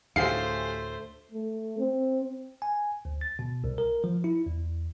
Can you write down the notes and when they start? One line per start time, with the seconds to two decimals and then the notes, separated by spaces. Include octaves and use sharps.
0.16 D2 A2 A3 G4 G#4 C5 F5 C7
1.32 A3
1.79 C4
2.62 G#5
3.05 D2
3.21 A6
3.39 B2
3.64 C2
3.78 A#4
4.04 F3
4.24 E4
4.46 E2